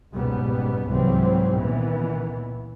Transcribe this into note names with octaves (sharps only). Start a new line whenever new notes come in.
F#1 C#2 G#2 B2 G3 B3
C2 G#2 E3 F#3 G3 C4
C#2 A#2 D#3 E3 B3